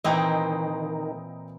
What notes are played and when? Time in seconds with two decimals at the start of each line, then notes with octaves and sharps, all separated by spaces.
0.04 A#2 D#3 E3 C4 D#5 G5 A#5